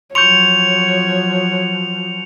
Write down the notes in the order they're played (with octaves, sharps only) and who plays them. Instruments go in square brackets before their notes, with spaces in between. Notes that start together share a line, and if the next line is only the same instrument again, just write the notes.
[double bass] F3 F#3 [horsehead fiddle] C#5 [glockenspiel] C6 C#6 G6 [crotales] C#7 F7